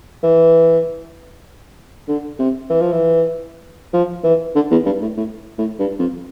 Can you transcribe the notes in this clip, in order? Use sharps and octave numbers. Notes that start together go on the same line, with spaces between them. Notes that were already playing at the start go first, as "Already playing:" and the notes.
E3
D3
C3
E3
F3
E3
F3
E3
D3
E2
G2
A2
A2
A2
G2
F2